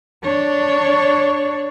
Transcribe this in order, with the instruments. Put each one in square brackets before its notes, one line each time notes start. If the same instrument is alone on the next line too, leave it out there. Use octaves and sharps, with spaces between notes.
[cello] D4 C#5